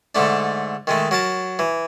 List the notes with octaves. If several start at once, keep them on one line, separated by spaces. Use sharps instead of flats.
G#2 D3 A3 D4
D#3 G#3 A3
F#3 A#4 A5
E3